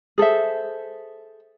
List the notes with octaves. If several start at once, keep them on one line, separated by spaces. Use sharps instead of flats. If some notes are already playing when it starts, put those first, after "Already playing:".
G#4 A4 C5 E5